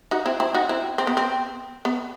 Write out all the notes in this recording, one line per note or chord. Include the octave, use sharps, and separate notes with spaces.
D#4 F#4
C4 E4
C4 E4
D#4 F#4
C4 E4
C4
B3
C4
B3